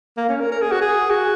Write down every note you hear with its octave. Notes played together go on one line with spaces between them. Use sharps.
A#3
C#4
A#4
A#4
G#4
F#4
G#4
F#4